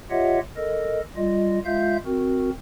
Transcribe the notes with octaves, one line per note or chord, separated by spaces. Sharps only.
F4 G4 C#5 D#5 E5 F#5
A4 A#4 D#5
G3 F4 D#5
G#3 F4 E5 F5 G6
C4 F#4 A#4